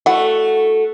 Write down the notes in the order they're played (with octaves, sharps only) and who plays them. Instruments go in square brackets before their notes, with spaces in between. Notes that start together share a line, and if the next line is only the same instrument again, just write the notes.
[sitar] A3 F#4 [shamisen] E4 D5 F#5